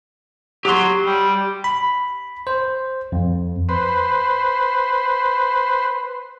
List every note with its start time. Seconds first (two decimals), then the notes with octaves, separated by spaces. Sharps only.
0.65 F#3 G4 C6
1.06 G3
1.64 B5
2.47 C5
3.12 F2
3.69 B4 C5